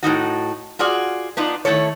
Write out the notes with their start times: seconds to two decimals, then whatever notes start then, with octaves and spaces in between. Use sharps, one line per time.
0.03 A2 G#3 D#4 F#4
0.79 F4 F#4 G#4 D5
1.37 B3 D4 D#4 F4
1.65 D#3 A3 E4 A4 C#5